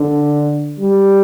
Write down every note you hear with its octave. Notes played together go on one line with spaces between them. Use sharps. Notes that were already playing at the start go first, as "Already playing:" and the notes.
Already playing: D3
G3